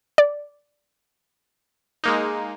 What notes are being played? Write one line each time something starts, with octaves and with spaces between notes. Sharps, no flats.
D5
G#3 A#3 D#4